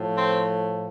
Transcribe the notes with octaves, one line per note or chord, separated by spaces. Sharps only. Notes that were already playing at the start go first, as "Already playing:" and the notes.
Already playing: A2 F3
C4